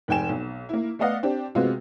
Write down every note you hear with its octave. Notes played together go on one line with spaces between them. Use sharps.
F1 G#2 G5 G#5 E7
B1
A#3 E4
A3 B3 D5 D#5 F5 F#5
C4 D4 G4
C3 G#3 B3 C4 F4 F#4